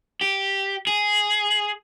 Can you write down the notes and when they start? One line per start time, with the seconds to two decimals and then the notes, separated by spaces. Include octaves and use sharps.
0.21 G4
0.87 G#4